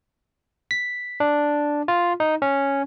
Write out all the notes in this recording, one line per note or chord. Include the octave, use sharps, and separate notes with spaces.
B6
D4
F4
D#4
C#4